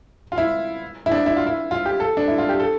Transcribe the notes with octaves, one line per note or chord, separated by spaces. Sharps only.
F4
E4
E4
D4
E4
F4
E4
F4
G4
A4
D4
E4
F4
G4
A4